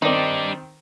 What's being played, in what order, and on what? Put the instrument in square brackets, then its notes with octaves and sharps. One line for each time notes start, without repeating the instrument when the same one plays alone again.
[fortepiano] D#3 C4 [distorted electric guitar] G3 D4 [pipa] D#4 D5